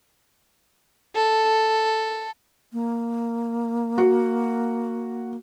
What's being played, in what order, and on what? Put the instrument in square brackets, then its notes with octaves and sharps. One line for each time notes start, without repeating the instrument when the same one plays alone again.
[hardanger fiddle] A4
[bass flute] A#3
[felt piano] F#4